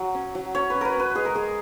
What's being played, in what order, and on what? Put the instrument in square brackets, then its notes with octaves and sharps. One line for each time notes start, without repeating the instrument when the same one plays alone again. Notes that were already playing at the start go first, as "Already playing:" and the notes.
Already playing: [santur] F#3
C#4
F#3
C#4 C#5
B4
C#4
A#4 B4
C#4 B4
G#3 G#4
A#4
G#3 G#4